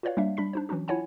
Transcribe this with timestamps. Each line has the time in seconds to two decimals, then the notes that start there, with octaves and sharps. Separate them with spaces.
0.03 F4 F#4 B4 C#5 D5 F5
0.17 G3 A#3 D4 E5 F5
0.37 G3 D4 B5 B6
0.53 D4 D#4 C5
0.69 E3 F#3 C#4 D4 F#4
0.88 E4 F4 C#5 F#5 G#5 A5